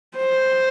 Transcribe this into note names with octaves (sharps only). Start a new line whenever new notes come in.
C5